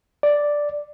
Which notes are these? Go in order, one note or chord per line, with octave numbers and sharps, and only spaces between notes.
D5